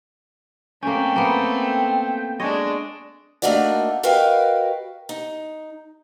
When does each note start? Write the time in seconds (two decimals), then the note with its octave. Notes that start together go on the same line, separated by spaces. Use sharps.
0.83 A3 A#3 C4 C#4 G5
1.16 A#3 B3
2.40 G#3 D4 C#5 D#5
3.42 A3 A#3 D4 D#4 F#4 D5
4.03 F#4 A#4 B4 D#5 F5 G5
5.09 D#4